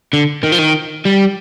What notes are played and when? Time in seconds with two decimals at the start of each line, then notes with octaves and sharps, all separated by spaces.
0.13 D3
0.43 D#3
0.52 F3
0.59 D#3
1.05 G3